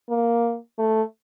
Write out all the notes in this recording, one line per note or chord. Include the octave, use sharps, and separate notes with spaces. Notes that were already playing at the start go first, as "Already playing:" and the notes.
A#3
A3